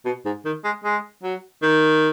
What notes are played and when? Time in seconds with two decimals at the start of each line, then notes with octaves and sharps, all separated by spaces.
0.05 B2
0.25 G#2
0.45 D#3
0.64 G#3
0.85 G#3
1.23 F#3
1.62 D#3